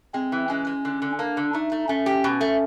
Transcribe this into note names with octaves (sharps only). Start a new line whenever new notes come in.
G#3 C4
E3
G#3 C#4
G#3
D3
D3
A#3 D4
D3
A3 D#4
A3
A3 C#4
G4
B2
A3